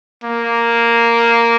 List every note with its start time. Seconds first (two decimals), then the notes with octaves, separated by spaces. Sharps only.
0.24 A#3